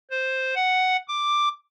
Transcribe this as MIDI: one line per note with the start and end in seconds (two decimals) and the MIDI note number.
0.10 0.54 72
0.55 0.97 78
1.08 1.48 86